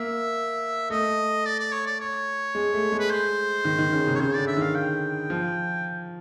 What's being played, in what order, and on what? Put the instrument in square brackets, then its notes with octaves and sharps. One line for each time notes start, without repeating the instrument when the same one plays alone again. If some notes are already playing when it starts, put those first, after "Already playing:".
Already playing: [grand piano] A#3 [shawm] E5
[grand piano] A3 [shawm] D#5
[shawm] D5
D5
C#5
D5
C#5
[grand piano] G#3
A3
G#3
[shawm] B4
C5
[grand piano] D#3
D#3
C#3
C3
[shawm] C#5
[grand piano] C#3 [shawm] C5
[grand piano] D3 [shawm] D5
[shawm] E5
[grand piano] D#3 [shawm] F5
[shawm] G5
[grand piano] F3